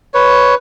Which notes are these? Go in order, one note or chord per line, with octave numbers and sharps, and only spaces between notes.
B4 C#5